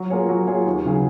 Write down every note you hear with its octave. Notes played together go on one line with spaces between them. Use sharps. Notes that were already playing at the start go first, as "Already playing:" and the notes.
Already playing: F#3
A#3 F4 G#4 C#5
F#3
A#3 F4 G#4 C#5
D#2
C#3 F#3 C#4 G#4